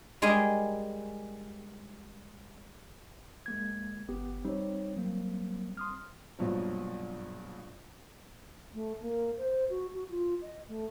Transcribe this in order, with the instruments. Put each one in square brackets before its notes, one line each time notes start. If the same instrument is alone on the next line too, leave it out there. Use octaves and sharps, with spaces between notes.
[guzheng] G3 G#3 G#4 A#4 D#5 G#5
[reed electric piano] G#3 A#3 G#6
[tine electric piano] G1 [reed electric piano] B3 G4
[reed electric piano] G3 C4 [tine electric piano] D#4 C#5
[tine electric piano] F#3 A#3
C6 D#6 F6
[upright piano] A#1 G2 B2 F3 F#3
[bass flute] A3
A#3
C5
F#4
F#4
F4
D#5
A3